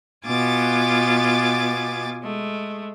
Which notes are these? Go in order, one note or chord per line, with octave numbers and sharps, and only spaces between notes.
B2 B3 F4 G#5 D6 A6
G#3 A3